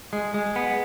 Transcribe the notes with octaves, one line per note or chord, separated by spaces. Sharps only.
G#3
G#3
B3